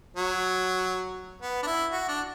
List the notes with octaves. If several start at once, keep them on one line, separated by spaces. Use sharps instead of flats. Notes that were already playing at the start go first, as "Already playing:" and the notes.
F#3
B3
D4
E4
F#4
D4